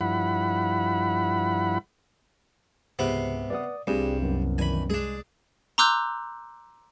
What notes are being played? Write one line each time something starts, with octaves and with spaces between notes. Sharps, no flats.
G2 F3 E4 F#5 B5
C#2 G#2 C3 B3
B4 D5 F#5 D#6
C2 G2 G3 C4 D4 F4 G#4
F#2 B3
D#3 E3 D5 G#5 B5
G#3 D4 G#4
A#5 C6 D6 E6 F#6 G6